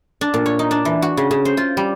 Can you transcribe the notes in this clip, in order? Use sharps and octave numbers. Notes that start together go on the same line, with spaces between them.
D4
A#2
C#5
D#4
D4
E3
F#4
C#3
C#3
C5
F4
G3